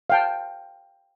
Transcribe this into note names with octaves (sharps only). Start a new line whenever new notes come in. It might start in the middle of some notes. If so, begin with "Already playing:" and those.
F5 G5 A5